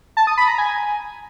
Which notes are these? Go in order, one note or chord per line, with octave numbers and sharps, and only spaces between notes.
A5
D#6
B5
A#5
G#5